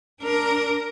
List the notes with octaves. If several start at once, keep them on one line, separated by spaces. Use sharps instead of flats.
D4 A#4